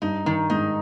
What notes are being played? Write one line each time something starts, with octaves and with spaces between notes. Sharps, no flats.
G2 D#4
G2 D#3
G#2 D#4